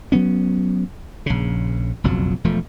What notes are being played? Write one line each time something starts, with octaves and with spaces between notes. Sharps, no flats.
F#3 B3 C#4
A#1 C#3
F#1 B1 F2 F#3
E1 F3 A3